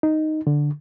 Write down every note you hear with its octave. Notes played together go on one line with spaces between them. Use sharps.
D#4
D3